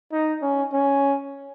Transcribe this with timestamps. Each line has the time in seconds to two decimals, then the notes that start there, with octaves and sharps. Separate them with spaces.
0.12 D#4
0.42 C#4
0.73 C#4